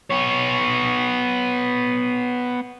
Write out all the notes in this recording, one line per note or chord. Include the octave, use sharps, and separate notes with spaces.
B3 C#5